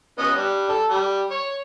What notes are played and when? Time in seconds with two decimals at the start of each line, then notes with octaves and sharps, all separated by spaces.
0.19 B3 C#4 D#5
0.35 G3 D4
0.69 A4
0.90 G3
1.31 C#5